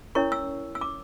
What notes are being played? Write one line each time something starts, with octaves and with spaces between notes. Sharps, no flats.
C#4 E4 A#4 C#5 C#6
E6
E6
D6